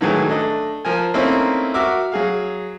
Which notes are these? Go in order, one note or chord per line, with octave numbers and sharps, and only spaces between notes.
A2 D#3 E3 F#3 G#3
A3 D4 D#5
F3 A#4 G#5
A3 A#3 C4 C#4 D#4 E4
F#4 A#4 E5 D6
F#3 G#4 F5